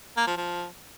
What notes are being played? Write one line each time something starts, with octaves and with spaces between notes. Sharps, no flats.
A#3
F3
F3